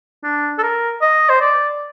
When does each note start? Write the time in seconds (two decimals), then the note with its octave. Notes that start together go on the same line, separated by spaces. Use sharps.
0.24 D4
0.58 A4
0.63 A#4
1.02 D#5
1.29 C5
1.41 D5